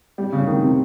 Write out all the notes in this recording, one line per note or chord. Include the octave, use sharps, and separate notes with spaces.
G3
C#3
D#3
C3